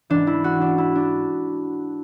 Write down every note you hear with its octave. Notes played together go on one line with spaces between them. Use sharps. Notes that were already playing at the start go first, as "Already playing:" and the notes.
G#2 E3 D4
E4
F#4
D4
E4
D4